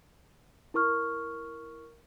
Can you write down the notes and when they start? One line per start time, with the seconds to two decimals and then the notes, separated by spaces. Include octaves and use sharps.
0.74 E4 A#4 C#6 F6